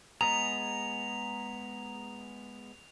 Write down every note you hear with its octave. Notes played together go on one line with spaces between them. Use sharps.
G#3 B3 G#4 A#5 F7